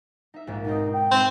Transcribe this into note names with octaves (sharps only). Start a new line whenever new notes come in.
D#4 E5
A#1 G#2
B2 C4 D#4
G5
G#3 C4 C5 E5